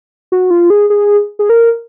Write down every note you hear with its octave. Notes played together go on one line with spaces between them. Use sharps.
F#4
F4
G#4
G#4
G#4
A#4